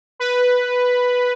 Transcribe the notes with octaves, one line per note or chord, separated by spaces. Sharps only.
B4